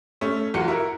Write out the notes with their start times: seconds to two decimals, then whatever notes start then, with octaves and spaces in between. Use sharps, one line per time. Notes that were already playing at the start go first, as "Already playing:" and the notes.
0.21 A3 C#4
0.54 B1 E2 F4 F#4 C#7
0.68 E4 F#4 A#4